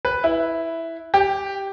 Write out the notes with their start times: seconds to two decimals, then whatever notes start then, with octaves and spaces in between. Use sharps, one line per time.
0.05 B4
0.24 E4
1.14 G4